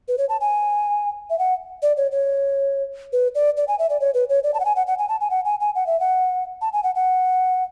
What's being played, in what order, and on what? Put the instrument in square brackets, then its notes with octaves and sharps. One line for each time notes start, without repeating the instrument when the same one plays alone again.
[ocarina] B4
C#5
A5
G#5
E5
F#5
D5
C#5
C#5
B4
D5
D5
G#5
E5
D5
C#5
B4
C#5
D5
A5
F#5
G#5
F#5
F#5
G#5
A5
G#5
F#5
G#5
G#5
F#5
E5
F#5
A5
G#5
F#5
F#5